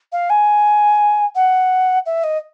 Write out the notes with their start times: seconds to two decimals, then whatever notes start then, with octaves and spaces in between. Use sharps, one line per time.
0.12 F5
0.30 G#5
1.35 F#5
2.06 E5
2.24 D#5